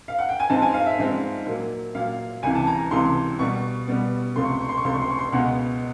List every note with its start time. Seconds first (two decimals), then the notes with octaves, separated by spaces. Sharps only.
0.08 F5
0.19 F#5
0.29 G5
0.40 G#5
0.50 G#2 F3 G#3 C4 A5
0.62 G#5
0.74 F5
0.86 E5
0.98 G#2 F3 G#3 C4
1.46 A#2 F#3 A#3
1.95 A#2 F#3 A#3 F5
2.43 C#2 C3 E3 G#5
2.55 A5
2.67 A#5
2.91 C#2 C3 E3 C6
3.39 B2 G3 B3 C#6
3.88 B2 G3 B3
4.35 C#2 C3 F3 A3 C6
4.44 C#6
4.52 C6
4.61 C#6
4.69 C6
4.77 C#6
4.84 C#2 C3 F3 A3 C6
4.93 C#6
5.02 C6
5.10 C#6
5.18 C6
5.32 C#2 B2 G#3 B3 F#5